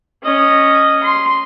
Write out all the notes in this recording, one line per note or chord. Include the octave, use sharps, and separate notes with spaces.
C#4 D#5
C6